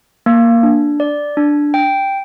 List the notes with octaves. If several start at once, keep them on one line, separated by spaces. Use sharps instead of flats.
A#3
D4
D5
D4
G5